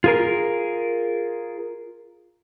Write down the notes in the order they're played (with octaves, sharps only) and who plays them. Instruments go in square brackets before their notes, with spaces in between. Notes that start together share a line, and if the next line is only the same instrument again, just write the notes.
[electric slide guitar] F4 G#4 A#4